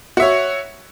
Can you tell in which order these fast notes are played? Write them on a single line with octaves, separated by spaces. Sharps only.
F#4 E5 C#5